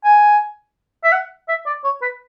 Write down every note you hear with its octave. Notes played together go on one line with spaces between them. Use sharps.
G#5
E5
F#5
E5
D5
C#5
B4